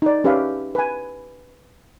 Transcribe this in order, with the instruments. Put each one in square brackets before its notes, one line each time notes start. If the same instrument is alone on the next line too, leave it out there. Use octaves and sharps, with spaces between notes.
[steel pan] D#4 D5
C#4 G4 B4 E5 F5
B4 G#5